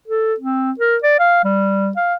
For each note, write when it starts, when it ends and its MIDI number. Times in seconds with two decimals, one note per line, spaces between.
0.08 0.34 69
0.40 0.72 60
0.79 0.97 70
1.03 1.18 74
1.19 1.42 77
1.44 1.92 55
1.97 2.15 77